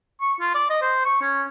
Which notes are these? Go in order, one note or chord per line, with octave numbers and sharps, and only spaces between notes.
C#6
F4
D5
D#5
C5
C#6
C#4